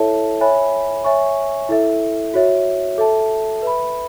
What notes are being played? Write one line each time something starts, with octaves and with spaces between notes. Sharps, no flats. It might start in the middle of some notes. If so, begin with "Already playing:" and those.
Already playing: E4 A4 C#5 E5 A5
C#5 E5 G#5 B5
C#5 E5 G#5 C#6
E4 A4 E5
F#4 C#5 E5
A4 E5 A5
B4 E5 B5